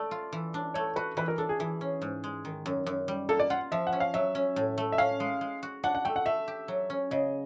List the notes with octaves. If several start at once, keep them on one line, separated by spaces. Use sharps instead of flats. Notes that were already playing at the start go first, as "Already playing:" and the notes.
Already playing: A3 D5
F4
E3
D4
A3 C#5
F#4 B4
E3 B4
A#4
D4 A4
G#4
E3 G#4
C#4
G#2
G#3
D#3
F#2
F#2
G3
A#3 A4
D5
F4 F#5
F3 E5
F#5
C#4
F5
F#3 E5
C#4
A2
A3
E5
C#4 F5
G#3
G#3
F#4
D4 F#5
F#5
A3 G5
F#5
A3 E5
G4
F#3
C#4
C#3 D#5